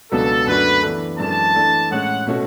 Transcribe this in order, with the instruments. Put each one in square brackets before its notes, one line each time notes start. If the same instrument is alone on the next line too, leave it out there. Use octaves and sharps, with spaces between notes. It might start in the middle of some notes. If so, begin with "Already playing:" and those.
[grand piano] C#2 B2 F#3 B3 D4 [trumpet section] A4
[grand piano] F#2 D3 A3 D4 F#4 [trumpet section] B4
[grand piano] E3 B3 D4 A4
[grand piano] F#2 E3 G#3 D4 A4 [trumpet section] A5
[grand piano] E3 A3 D4 A4
[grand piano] A2 G#3 C#4 [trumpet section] F#5
[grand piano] B2 A3 C#4 F#4